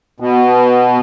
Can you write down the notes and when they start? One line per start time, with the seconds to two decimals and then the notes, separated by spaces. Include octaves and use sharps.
0.20 B2